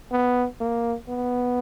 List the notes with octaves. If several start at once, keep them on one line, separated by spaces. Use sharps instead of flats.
B3
A#3
B3